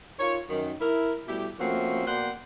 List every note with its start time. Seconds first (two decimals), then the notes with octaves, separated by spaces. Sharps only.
0.19 D#4 F4 A#4 C#5
0.49 F#2 D#3
0.81 E4 A#4
1.27 B2 G3 A3 E4 G4
1.59 F3 A3 A#3 C4 C#4 F#4
2.06 B2 A#3 D5 F#5 G5 C6